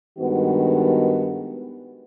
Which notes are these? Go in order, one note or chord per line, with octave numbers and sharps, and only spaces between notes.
G2 D#3 G#3 B3 F#4